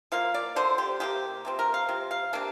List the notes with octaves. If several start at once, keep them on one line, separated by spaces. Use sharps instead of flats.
F3 A#3 F5
D5
D3 A#3 D4 C5
G4
C3 F3 A#3 G4
C3 F3 C4
A#4
F5
C3 F3
F5
C3 A#3 D4